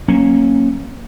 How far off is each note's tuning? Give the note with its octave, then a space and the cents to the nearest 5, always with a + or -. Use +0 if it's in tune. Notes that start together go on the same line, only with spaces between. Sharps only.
F#3 +0 A#3 +0 C#4 -15